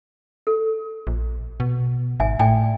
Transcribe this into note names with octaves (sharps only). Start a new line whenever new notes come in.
A4
A#1
B2
G#1 E5 G#5
A2 D5 G5 G#5